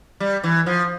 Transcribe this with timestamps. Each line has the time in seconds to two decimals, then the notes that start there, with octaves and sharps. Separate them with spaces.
0.20 G3
0.44 E3
0.66 F3